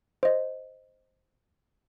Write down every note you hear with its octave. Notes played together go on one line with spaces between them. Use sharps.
C5 D#5